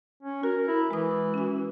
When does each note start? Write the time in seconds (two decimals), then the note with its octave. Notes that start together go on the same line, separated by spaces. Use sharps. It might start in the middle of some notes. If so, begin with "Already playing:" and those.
0.23 C#4
0.43 F#4 A#4
0.68 E4
0.91 E3 G#3 D#6
1.34 C#4 F#4